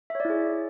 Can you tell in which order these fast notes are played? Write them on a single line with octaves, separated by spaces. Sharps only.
E5 C#5 D5 E4 G#4